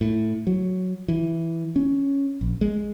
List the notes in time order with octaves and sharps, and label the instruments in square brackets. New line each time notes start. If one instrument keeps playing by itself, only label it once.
[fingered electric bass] A2
F#3
E3
C#4
A#1
G#3